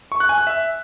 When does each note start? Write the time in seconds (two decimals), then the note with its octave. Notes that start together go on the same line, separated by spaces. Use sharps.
0.12 C#6
0.20 F#6
0.29 G#5
0.38 F#6
0.47 E5